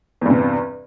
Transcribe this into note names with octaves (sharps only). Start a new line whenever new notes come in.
E2 G2 C3